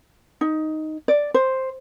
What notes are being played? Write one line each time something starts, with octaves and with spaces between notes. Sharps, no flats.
D#4
D5
C5